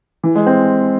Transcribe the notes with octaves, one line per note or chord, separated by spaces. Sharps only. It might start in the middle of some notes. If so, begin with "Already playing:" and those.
E3
G#3
C4